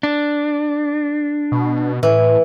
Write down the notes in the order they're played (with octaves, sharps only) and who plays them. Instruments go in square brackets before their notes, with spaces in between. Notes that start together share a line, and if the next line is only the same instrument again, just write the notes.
[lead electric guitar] D4
[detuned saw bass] B2
[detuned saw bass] A2 [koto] E3